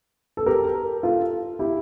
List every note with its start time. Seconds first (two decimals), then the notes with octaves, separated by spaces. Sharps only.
0.37 A4
0.46 G4 A#4
1.03 F4 A4
1.59 E4 G4